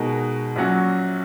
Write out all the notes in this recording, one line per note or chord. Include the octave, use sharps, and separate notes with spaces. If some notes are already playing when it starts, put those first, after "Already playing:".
Already playing: B2 G#3 D#4 F#4 A#4
A#1 A#2 F#3 C#4 F#4